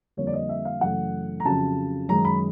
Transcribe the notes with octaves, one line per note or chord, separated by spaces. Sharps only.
F2 D3 G3 A#3 C#5
D5
D#5
E5
F5
F#2 C#3 E3 A3 F#5
A#5
F2 C#3 F#3 A5
F#2 D#3 G#3 A#5
B5